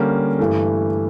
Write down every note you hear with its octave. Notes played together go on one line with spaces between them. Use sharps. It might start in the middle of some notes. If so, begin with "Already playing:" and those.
Already playing: D3 G3 A#3 C#4
G2 E3 A3